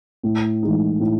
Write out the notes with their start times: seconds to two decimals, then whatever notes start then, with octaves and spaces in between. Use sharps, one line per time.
0.23 A2
0.63 E3 G#3 D#4
1.00 A2